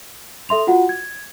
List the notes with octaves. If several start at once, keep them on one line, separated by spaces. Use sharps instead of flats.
A4 E5 C6 F7
F4 F#4 F#5
G#6